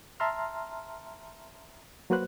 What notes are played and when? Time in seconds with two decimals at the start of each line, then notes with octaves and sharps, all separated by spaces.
0.20 E5 A5 A#5 C6 F6
2.10 F#3 A#3 F#4 B4 C5 F#6